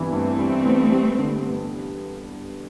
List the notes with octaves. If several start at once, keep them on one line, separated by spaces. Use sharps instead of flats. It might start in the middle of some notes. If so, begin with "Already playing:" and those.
Already playing: G2 E3 B3
G2 A3 C4
G2
B3
G3
D3
G2